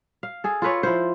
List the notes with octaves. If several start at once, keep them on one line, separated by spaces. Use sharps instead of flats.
F5
G#4 A4
F4 A4 B4 C#5
F3 E4 F4 C5